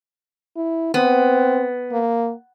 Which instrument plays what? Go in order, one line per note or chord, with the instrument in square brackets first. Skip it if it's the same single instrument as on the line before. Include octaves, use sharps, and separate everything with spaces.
[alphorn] E4
[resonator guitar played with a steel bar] B3 [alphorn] C4
[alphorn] A#3